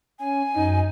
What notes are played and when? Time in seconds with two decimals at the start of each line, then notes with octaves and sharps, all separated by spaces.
0.19 C#4 G#5
0.56 F#2 D#4